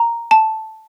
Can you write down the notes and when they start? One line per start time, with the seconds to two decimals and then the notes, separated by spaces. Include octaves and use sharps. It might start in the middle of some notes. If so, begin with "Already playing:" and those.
Already playing: A#5
0.31 A5